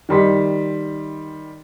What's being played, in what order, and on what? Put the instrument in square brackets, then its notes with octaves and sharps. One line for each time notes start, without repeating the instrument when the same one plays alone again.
[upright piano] D#3 G3 C6 B6